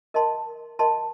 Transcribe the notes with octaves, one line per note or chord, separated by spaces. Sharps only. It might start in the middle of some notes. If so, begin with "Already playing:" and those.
A#4 D#5 A5 C6
A#4 D#5 A5 C6